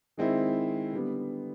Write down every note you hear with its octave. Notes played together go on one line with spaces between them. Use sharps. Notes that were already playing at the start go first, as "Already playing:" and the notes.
D#3 G#3 C4 E4
D3 G3 B3